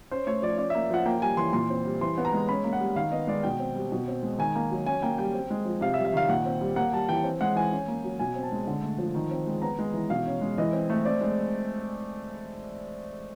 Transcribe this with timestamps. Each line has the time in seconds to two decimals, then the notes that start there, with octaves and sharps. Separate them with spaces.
0.11 C#4 C5
0.27 A3 C#5
0.42 F3 D5
0.58 C#4 D5
0.70 E5
0.75 A#3
0.90 F3 F#5
1.06 A#3 G5
1.22 G3 G#5
1.37 E3 C6
1.53 A#2 C6
1.70 C4
1.85 G3
2.01 E3 C6
2.18 B3
2.25 A#5
2.33 G#3
2.49 C#4 B5
2.64 A#3
2.73 F#5
2.80 G3
2.96 D#3 F5
3.12 B3 D#5
3.27 G#3 D5
3.43 B2 G5
3.59 C4
3.75 G3
3.92 B2
4.08 C4
4.23 G#3
4.38 D#3 G#5
4.55 A#3
4.71 F#3
4.86 C#4 G#5
5.02 A#3 G5
5.18 G3 G5
5.34 C4
5.50 G#3
5.65 F3
5.81 C3 F5
5.94 E5
5.97 G3
6.05 E5
6.13 D#3 F5
6.29 A#2 F#5
6.45 C4
6.61 G3
6.76 A#3 F#5
6.93 G3 A5
7.09 E3 G5
7.24 C4
7.41 G#3 F#5
7.56 E3 G#5
7.71 C#4
7.88 A#3
8.04 F#3
8.19 B2 G#5
8.36 C4
8.43 A5
8.52 G#3
8.67 D3
8.83 A3
8.98 F3
9.15 D#3
9.31 C4
9.47 G#3
9.62 B3 A#5
9.79 G#3
9.94 E3
10.10 B2 F5
10.26 C#4
10.41 G#3
10.58 E3 D#5
10.73 C4
10.90 A3
11.05 C4 D5
11.21 G#3